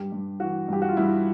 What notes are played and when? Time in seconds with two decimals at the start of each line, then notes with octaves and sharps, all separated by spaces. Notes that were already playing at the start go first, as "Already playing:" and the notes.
Already playing: G2 G4
0.12 G2
0.40 E3 F#4
0.68 G2 G4
0.82 F#4
0.89 F4
0.97 G2 E4